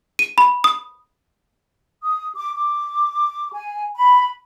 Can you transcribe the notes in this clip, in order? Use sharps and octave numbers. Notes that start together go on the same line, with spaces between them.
D#7
B5
D#6
D#6
D6
D6
G#5
B5